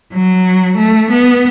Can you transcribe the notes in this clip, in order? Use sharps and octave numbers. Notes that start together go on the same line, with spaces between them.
F#3
A3
B3